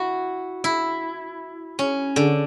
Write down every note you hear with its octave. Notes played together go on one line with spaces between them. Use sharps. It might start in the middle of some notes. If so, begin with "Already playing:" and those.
Already playing: E4 F#4
E4
C#4
D3